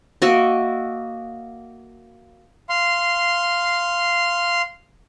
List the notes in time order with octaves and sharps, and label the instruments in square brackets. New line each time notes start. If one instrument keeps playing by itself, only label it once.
[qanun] A#3 F#4 D#5 E5
[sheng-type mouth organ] F5 C6